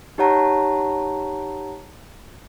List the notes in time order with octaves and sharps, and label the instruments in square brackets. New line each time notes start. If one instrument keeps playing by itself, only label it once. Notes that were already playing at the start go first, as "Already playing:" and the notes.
[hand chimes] D#4 G4 C#5 F#5 A5 A#5